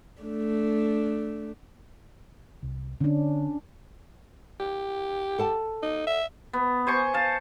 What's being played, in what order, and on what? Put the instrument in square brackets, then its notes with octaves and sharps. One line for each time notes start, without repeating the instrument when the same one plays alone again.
[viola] A3 D4
[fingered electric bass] C2
[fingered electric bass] D3 [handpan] C#4 D4
[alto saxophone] G4
[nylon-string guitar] A4 F#5 A5
[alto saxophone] D#4
E5
[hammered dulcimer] B3
C5 G#5 C#6
F5 A5